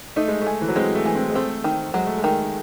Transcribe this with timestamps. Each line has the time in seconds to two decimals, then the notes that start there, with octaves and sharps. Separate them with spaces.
0.16 A3 D#4
0.28 G#3
0.42 A3 G#4
0.61 E3
0.68 F#3
0.76 G#3 C4
0.95 A3
1.06 E3
1.15 C4
1.30 G#3
1.35 A3 C4
1.64 D#3
1.94 F#3 G#3
2.07 A3
2.18 G#3
2.24 D#3